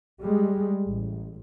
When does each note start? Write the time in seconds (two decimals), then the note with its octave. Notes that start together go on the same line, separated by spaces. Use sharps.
0.22 G3 G#3
0.88 A1